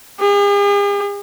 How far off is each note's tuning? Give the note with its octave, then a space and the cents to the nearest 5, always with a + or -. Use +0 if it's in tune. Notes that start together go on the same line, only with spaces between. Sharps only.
G#4 -45